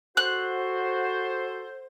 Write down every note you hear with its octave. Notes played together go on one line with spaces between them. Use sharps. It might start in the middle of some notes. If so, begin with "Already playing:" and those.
F#4 A4 C5 F#6